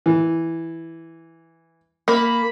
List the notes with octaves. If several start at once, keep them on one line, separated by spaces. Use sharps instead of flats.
E3
A#3 B5